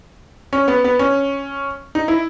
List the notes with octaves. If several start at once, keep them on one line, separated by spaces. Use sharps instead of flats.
C#4
B3
B3
C#4
D#4
E4